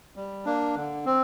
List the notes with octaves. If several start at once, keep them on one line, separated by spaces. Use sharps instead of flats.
G3
A#3 D4
D3
C4